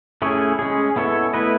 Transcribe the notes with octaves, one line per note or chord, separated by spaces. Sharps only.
A3 C#4 E4 G#4 C#5
G#3 C#4 G#4
B3 E4 A4 C#5
A3 E4 B4 D#5